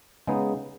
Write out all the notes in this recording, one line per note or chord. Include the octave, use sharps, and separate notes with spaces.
C#3 G#3 B3 D#4